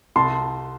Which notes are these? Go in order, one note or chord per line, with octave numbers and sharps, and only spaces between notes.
C2 A5 C6